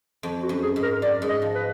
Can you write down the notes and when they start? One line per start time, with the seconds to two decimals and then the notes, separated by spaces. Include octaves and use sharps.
0.23 F2
0.43 F#4
0.49 F#2
0.62 G#4
0.76 G#2
0.82 A#4
1.02 F#2 D5
1.22 G#2
1.29 D#5
1.42 F3
1.55 B4